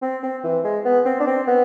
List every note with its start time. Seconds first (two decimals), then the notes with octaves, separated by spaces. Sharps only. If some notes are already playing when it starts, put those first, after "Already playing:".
0.02 C4
0.23 C4
0.44 E3
0.65 G#3
0.85 B3
1.06 C4
1.20 D4
1.27 C4
1.47 B3